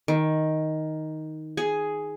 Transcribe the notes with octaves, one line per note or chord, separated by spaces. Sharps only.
D#3
G#4